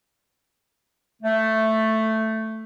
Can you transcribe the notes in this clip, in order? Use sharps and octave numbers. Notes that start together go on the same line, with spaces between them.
A3